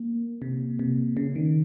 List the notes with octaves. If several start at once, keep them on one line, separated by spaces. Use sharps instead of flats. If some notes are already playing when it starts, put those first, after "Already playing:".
Already playing: A#3
C3
C3
C#3
D#3